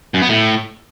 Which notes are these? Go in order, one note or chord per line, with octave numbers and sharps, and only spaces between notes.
F#2
B3
A2